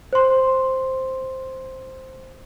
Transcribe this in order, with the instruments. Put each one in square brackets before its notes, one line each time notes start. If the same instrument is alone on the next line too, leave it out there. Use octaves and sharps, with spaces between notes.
[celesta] C5 C6